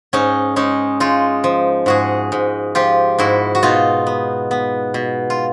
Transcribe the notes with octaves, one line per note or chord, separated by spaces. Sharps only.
G#2 C#4 D#4
G#3 C#4 D#4
G#3 D#4 F4
F3
G#2 F#4 G#4
G#2
F3 F4 G4
G#2 E4 F#4
F#4
B2 D#4 F4
B3
B3
B2
F4